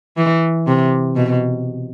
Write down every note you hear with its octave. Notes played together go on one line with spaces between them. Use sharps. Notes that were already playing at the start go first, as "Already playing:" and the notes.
E3
C3
B2